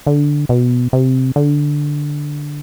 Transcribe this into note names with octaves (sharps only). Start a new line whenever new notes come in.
D3
B2
C3
D3